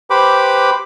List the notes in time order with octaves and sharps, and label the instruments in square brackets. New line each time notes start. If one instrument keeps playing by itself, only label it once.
[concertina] G4 B4 C5 B5 D6